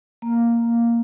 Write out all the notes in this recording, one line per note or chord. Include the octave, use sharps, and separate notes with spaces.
A#3